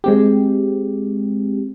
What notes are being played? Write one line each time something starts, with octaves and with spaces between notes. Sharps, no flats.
G#3 C4 G4